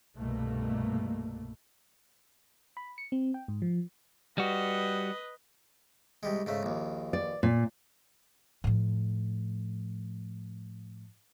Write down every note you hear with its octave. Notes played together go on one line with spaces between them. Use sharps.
C2 G2 B2 A3 A#3
B5
C#7
C4
G5
G#2
F3
G3 F#4 B4 D#5
C2 G3 G#3
G#2 C#3 A3
A#1 D#2
D5
A#2
A2 F3